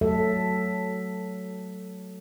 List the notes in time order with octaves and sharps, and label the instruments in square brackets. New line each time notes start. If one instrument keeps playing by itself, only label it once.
[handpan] F#3 A3 A4 E5